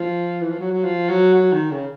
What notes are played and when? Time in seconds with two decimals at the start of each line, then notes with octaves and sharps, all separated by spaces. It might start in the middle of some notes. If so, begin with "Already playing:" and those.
Already playing: F3
0.41 E3
0.50 F3
0.59 F#3
0.72 F#3
0.84 F3
1.09 F#3
1.34 F#3
1.53 D#3
1.71 C#3